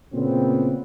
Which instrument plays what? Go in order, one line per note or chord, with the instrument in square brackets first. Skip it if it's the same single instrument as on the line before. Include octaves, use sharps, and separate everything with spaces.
[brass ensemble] A#2 C#3 B3 C4